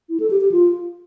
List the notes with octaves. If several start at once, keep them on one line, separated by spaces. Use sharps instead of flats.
E4
A4
G4
G4
F4